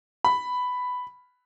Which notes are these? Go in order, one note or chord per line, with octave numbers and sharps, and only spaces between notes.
B5